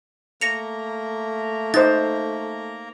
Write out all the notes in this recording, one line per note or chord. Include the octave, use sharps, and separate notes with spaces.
A3 A#3 A#5 A#6 C#7 F7
D#4 C5 A6